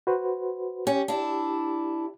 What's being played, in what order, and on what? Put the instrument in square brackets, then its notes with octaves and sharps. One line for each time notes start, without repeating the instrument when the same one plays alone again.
[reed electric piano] F#4 B4 C5
[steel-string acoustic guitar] C#4 [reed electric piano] G4
[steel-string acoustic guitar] D4 E4